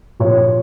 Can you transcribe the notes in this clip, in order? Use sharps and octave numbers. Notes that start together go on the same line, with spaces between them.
A#2 F3 C#5